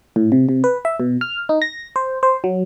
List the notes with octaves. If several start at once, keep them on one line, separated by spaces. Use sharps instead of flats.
A2
C3
C3
B4
E5
B2
F6
D#4
A#6
C5
C5
F#3